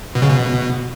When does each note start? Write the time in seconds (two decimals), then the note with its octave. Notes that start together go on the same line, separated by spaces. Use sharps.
0.15 B2
0.22 C#3
0.29 B2